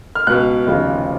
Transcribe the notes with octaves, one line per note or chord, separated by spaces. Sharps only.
F6
C#2 B2 F#6
F1 D#2 C#3 F3